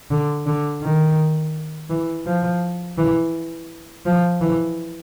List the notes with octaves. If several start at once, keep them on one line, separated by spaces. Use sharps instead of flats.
D3
D3
D#3
E3
F3
E3
F3
E3